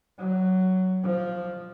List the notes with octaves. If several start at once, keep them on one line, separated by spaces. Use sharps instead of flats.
F#3
F3